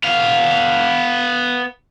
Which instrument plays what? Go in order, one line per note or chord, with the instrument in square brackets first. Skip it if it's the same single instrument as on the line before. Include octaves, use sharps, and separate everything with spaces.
[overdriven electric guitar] B3 F5